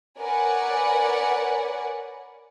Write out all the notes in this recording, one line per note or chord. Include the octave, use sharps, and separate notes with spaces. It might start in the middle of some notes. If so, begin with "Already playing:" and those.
A#4 B4 C#5 D5 F#5 G#5